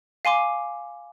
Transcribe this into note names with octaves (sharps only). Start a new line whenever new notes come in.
F5 G#5 C6 D6